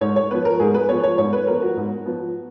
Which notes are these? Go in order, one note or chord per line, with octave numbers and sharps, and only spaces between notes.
G#2 C#5
C#5
F3 B3 B4
A#4
G#2 G#4
B4
F3 B3 C#5
C#5
G#2 C#5
B4
F3 B3 A#4
F#4
G#2
F3 B3